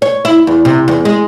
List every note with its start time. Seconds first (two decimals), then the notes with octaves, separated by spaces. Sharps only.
0.02 C#5
0.25 E4
0.47 E2
0.65 C3
0.88 E2
1.05 G#3